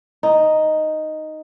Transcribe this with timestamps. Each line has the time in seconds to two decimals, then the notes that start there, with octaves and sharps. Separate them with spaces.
0.23 D#4